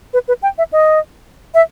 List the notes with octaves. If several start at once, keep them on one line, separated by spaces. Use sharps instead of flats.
B4
B4
G5
E5
D#5
E5